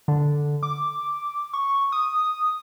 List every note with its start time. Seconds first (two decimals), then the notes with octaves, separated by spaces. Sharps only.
0.08 D3
0.63 D6
1.53 C#6
1.92 D#6